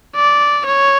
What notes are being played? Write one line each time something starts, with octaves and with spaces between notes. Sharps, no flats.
D5
C#5